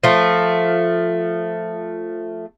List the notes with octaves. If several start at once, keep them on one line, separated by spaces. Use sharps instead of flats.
F3 A3